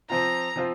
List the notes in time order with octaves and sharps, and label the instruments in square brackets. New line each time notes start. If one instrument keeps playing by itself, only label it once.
[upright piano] F3 C4 F4 [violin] A#5
[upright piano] F3 C4 F4